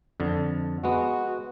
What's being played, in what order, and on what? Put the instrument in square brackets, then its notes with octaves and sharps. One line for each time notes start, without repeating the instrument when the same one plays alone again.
[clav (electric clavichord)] F2 D3
[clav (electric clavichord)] G#3 B3 [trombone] F#4